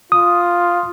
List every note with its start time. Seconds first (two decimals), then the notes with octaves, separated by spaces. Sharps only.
0.12 F4 D#6